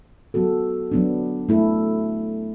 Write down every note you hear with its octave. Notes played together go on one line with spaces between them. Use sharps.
F#3 B3 F#4 A4
F#3 B3 D4
A3 E4 A4